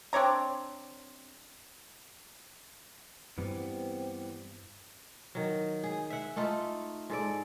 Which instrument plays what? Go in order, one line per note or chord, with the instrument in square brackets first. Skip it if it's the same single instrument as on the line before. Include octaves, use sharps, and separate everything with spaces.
[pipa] C4 D4 C#5 A#5
[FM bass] G2 [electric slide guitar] E3 G3 B3 [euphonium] C4
[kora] D#3 F#3
G#4
E5 F#5
A3 D#4 F4 A4
G#2 A4 D5